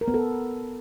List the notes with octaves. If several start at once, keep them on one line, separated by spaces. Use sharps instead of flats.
A#4
B3
A4